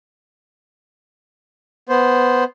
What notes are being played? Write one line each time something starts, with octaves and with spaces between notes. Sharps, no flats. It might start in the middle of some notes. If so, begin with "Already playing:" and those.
B3 C5